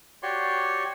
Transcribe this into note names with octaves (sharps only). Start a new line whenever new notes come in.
F#4 G4 C#5 D5 C6 C#6